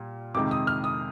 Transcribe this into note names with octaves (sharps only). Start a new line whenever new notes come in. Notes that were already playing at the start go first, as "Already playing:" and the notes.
Already playing: A#2 G3
F2 C3 D#3 G#3 D6
D#6
F6
D#6